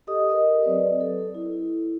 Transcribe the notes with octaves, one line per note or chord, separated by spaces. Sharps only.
G4 A4 D#5 D#6
A#4 D#5
F#3 C4 B4 D5
A4
E4